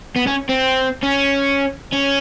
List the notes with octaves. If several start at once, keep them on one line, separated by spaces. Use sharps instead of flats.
B3
C#4
C4
C#4
C#4